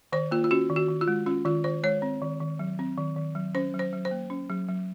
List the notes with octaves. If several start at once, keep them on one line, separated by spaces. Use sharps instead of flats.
D#3 C5
A#3 F4
F4
C#4 F#4
D#3
F#4
D#3
F4
G#3
C#4 F4
D#3 F4
D#3 C5
G#3 C#5
C4
D#3
D#3
F#3
C4
D#3
D#3
F#3
C#4 C5
F#3
C5
F#3
C5
A#3
C#4
F#3
F#3